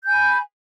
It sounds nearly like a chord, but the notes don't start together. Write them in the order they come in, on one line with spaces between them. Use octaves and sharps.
G6 G#5 B5